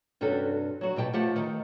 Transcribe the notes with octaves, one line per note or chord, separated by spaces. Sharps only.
G2 C3 C#4 D4 F#4 A4
F#3 F#4
B2 G4 G5 A5
F3 A3 G4 F#5 A5
D#3